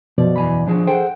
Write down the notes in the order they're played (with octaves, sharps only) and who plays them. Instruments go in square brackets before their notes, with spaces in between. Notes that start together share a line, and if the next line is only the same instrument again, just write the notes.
[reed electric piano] F#2 B2 D5 [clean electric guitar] F3
[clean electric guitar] E2 G#5 B5
D3 F3 G#4
[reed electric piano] G#4 A4 C5 [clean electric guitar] F#5 G5